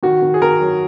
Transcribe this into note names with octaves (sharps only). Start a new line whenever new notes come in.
D#3 F#4
D#3
G#4
D#3 A#4
F#3